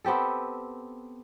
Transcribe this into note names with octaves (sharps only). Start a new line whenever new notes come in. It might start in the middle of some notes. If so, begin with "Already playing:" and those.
B3 C4 G4 A4